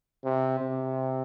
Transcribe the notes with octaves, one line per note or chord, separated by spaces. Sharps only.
C3
C3